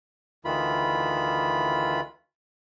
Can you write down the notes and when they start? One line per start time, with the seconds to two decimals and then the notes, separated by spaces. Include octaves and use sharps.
0.45 D2 D#3 E3 F4 B5